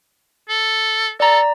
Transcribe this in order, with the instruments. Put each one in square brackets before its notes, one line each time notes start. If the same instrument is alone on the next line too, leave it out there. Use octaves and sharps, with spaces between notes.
[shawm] A4
[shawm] A4 [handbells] D5 A#5